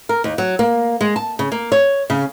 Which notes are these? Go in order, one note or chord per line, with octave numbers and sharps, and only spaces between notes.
A#4
D#2
F#3
A#3
G#3
A5
C#3
A#3
C#5
C#3